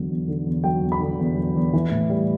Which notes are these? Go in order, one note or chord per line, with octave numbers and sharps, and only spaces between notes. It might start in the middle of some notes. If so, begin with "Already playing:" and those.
Already playing: E2 D3 F#3
E2
D3
E2
F#3 G5
E2
B5
D3
E2
F#3
E2
E3
A2
G3